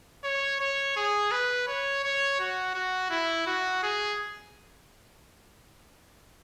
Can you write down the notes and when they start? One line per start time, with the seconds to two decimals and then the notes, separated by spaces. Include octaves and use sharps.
0.24 C#5
0.60 C#5
0.96 G#4
1.31 B4
1.68 C#5
2.04 C#5
2.40 F#4
2.75 F#4
3.10 E4
3.47 F#4
3.83 G#4